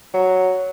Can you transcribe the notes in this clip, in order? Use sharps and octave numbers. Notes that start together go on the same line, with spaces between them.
F#3